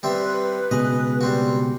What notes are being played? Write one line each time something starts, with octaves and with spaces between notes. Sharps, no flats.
G3 C4 B4 E5
C#2 B2 G#4 D#5
G3 C4 F#4